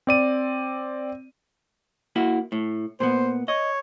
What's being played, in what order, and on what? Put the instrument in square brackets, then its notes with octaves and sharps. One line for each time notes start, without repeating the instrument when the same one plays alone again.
[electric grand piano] C4 D5 D#7
[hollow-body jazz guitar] A#3 E4 F#4
A2
[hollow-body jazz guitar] A#2 B3 [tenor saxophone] C5
[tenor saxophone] C#5 [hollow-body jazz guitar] D#5